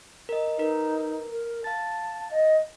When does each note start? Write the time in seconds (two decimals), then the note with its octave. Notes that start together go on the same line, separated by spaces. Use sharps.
0.29 A#4 D#5
0.58 D#4 A#4 B4
1.32 A#4
1.64 F5 A5 A6
2.31 D#5